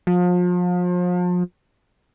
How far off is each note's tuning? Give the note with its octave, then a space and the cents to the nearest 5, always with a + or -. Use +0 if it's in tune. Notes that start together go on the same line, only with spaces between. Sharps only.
F3 +35